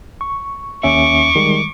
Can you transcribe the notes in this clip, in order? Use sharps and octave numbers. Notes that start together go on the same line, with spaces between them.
C#6
D#2 C#4 E5 C#6 D6
D#3 G3 G#3